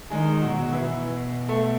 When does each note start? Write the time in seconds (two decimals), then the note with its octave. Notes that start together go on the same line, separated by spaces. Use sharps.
0.10 D#3 G#3 G#4
0.42 F#3 F#4
0.57 B2
0.73 E3 E4
1.49 A3 A4